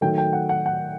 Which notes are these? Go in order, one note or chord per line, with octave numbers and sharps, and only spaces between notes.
D#3 F#3 A3 G5
G5
F#5
F#5
F#5